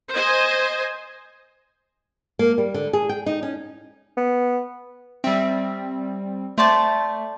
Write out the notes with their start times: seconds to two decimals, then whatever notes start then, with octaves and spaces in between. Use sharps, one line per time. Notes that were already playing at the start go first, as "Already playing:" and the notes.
0.12 C5 D#5 G#5
2.39 A#3
2.58 G3
2.74 D3
2.93 G#4
3.09 G5
3.26 D#4
3.43 C#4
4.17 B3
5.24 G3 C4 E5
6.58 A3 C5 D5 A5